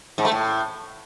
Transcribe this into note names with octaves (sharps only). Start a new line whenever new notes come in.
G#2
A3
A2